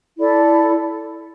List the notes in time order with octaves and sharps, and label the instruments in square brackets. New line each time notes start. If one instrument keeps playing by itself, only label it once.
[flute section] E4 A4 D5